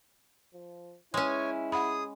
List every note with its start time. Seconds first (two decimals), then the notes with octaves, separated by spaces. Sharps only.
0.54 F3
1.14 G#3 C#4 E4 C#5 G#5
1.72 G#4 F#5 B5 D#6